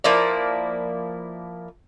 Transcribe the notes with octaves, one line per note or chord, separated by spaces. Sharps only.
F3 A#3 E4 D5